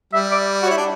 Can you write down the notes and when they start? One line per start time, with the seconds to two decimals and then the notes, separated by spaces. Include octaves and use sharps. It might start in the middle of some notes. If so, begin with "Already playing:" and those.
0.13 G3 E5
0.32 D5
0.62 F#4
0.66 C#5
0.70 E4
0.77 D4